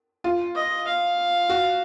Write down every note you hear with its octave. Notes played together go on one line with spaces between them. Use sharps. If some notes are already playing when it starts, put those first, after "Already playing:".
F4
D#5
F5
F#4